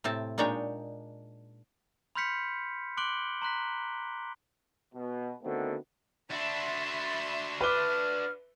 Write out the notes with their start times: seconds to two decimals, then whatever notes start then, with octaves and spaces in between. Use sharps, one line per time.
0.04 A2 C3 C4 A5
0.38 A#2 G#3 D4 D#4 C#5 G5
2.15 B5 C6 F6 G6 B6 C#7
2.97 C6 D6 F#6 D7 F#7 G7
3.42 A#5 C6 F#6 B6
4.95 B2
5.44 D3 D#3 A3 B3 C4 F#4
6.30 D4 F#4 E5 B5 C6
7.61 B4 D6 F6 G7